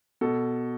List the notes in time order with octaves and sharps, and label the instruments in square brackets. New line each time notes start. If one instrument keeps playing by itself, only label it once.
[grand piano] B2 A4